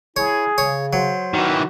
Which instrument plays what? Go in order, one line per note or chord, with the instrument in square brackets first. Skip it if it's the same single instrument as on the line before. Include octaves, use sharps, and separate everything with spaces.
[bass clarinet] E4 [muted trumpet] G#4 [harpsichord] C#5
[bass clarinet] C#3 [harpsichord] C#5
[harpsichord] F#3 [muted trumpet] C5
[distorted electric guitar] D#3 E3 [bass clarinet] F#4